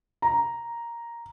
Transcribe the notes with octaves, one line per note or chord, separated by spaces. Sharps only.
A#5